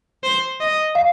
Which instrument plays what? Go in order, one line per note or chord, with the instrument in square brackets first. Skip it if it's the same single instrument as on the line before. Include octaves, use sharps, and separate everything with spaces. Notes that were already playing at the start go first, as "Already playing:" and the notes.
[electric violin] C5
D#5
[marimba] F5